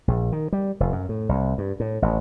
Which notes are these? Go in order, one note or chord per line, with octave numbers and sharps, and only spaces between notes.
A#1
D#3
G3
F1
F#2
A2
C2
G2
A2
A1